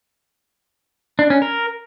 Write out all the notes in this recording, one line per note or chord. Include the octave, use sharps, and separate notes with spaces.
D4
C#4
A#4